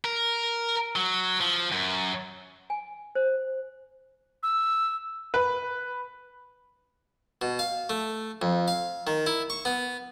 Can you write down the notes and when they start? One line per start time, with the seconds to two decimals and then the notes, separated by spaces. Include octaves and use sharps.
0.04 A#4
0.96 F#3
1.41 F3
1.72 F#2
2.70 G#5
3.15 C5
4.43 E6
5.34 B4
7.42 B2
7.59 F5
7.90 A3
8.42 F2
8.68 F5
9.07 D#3
9.27 E4
9.50 C#6
9.65 B3